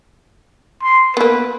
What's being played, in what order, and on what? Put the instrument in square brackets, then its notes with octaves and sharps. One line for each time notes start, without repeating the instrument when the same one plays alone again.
[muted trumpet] C6
[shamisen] A#3 B3 [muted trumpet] B4